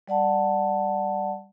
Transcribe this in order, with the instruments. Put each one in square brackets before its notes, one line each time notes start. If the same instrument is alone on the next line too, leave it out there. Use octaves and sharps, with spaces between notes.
[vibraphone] G3 D5 F#5 A5